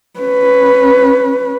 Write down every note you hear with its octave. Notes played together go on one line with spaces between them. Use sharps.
C#4 B4